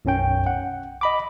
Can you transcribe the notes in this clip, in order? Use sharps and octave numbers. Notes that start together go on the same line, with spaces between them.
B1 F#2 C#4 G5
F#5
D#5 B5 D6